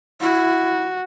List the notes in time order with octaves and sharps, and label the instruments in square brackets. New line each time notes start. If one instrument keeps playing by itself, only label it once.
[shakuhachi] E4 [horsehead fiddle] F#4